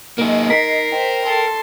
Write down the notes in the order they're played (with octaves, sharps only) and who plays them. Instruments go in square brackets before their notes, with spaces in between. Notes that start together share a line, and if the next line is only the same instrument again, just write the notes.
[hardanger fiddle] G#3 D#4 [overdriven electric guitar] A#3 G#4
[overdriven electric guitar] A#4 [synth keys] B6 [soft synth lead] C7
[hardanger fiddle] C5 [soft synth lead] G5
[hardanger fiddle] A4 C6